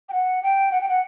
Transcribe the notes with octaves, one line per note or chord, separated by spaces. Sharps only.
G5
F#5
G5
F#5
G5
F#5